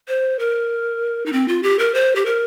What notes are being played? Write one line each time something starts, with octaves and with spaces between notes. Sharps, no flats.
C5
A#4
D#4
C4
F4
G4
A#4
C5
G4
A#4